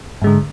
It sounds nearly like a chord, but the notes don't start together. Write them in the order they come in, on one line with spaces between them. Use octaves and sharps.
G#2 G#3 D3